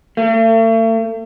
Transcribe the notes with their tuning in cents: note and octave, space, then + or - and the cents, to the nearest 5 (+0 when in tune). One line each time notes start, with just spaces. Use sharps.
A3 +40